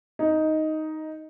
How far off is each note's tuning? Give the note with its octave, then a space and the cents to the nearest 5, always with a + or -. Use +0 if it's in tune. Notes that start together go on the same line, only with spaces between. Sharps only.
D#4 +5